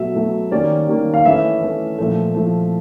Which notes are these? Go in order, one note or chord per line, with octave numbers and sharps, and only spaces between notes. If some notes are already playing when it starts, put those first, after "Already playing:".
Already playing: B2 F#3 A3 E5
B2 F#3 A3
D#3 G3 A#3 C#4 D5
D#3 G3 A#3 C#4
F5
E3 A3 C#4 E5
E3 A3 C#4
A#2 F3 A3
A#2 F3 A3